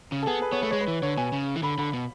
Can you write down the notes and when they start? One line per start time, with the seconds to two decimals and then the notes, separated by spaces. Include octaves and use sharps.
0.12 C#3
0.23 A4
0.27 B3 G#4
0.42 B4
0.52 B3 C#5
0.62 A3 B4
0.71 G#3 C#5
0.81 B4
0.88 E3
1.02 D3 C#5
1.17 B2 G#5
1.32 C#3
1.56 E3
1.63 D3 B5
1.78 D3 B5
1.93 B2